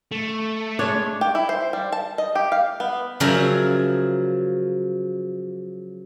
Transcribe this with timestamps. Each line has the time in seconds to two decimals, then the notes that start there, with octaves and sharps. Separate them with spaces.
0.11 A3
0.79 G#3 D4 C#5
1.21 G4
1.35 E4
1.49 C5
1.73 G3
1.92 A5
2.18 D#5
2.35 G4
2.52 F5
2.80 B3
3.20 C#3 F3 F#3 G#4 A#4 E5